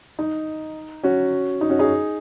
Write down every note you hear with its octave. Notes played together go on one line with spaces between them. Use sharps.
D#4
C#4 F#4
D#4
C#4 F#4
D#4 G#4